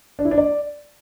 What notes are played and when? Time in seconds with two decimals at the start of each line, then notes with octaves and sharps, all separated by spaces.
0.19 D4
0.25 E4
0.31 D4
0.38 D5